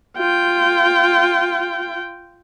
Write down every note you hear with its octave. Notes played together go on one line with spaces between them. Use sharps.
F4 G5